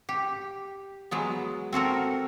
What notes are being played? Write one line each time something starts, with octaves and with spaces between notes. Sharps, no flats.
G4
F#3 G#3 B3
C4 F#4 A4 A#4